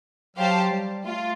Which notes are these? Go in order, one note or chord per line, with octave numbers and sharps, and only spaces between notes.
F#3 G4 C5 F5 A5
G3
A3 F4